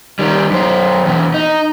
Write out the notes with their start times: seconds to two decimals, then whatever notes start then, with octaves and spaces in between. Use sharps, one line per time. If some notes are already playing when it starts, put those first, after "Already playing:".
0.19 D#3 G3
0.51 F#2 C5
1.05 E2 B2
1.34 D#4